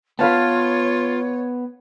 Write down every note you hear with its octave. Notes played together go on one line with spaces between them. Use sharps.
B3 F4 B4 C#5 F5 A5